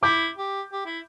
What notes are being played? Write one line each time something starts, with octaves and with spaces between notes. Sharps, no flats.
E4 D6 G6
G4
G4
E4